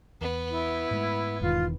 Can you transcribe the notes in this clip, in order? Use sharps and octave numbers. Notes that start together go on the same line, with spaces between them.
E2 B3
E4
G#2 G#3 A3
E1 E2 D#3 F4